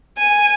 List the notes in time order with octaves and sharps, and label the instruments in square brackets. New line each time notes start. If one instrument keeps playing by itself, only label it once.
[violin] G#5